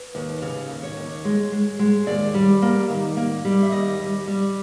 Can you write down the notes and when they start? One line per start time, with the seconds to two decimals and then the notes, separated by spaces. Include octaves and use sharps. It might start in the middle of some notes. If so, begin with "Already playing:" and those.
Already playing: B4
0.15 D#2
0.42 C#3
0.69 D#2
0.83 C#5
0.97 D#2
1.25 G#3
1.52 G#3
1.79 G#3
2.07 D#2 D5
2.34 G3
2.62 A#3
2.90 D#3
3.17 A#3
3.45 G3
3.62 E5
3.72 D#2 D#5
3.99 G3
4.27 G3